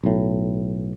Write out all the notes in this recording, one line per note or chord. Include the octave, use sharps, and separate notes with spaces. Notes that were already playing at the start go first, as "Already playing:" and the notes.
B1 A2